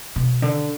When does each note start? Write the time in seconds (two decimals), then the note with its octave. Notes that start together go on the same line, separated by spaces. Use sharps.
0.16 B2
0.42 D3